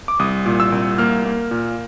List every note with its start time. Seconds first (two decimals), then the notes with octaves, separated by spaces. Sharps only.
0.08 D6
0.19 C2 D#6
0.46 A#2
0.60 E6
0.72 C2
0.98 A#3 F6
1.26 A#3
1.51 A#2